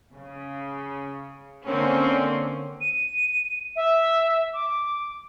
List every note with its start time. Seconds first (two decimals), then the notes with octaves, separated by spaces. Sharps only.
0.15 C#3
1.68 D3 A#3 C4 C#4
2.81 D#7
3.76 E5
4.54 D6